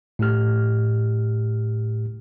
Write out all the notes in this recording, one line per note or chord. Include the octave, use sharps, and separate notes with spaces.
A2 A3 G4 F6